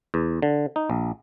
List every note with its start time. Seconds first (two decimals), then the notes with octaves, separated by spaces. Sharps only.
0.14 E2
0.42 D3
0.76 D#4
0.90 A#1